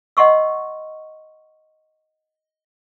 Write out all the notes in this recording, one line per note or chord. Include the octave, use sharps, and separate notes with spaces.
D#5 F#5 C6 C#6 E6